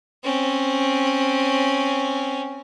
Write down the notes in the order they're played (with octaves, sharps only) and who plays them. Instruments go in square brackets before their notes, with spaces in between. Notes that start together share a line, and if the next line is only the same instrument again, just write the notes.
[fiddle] C4 C#4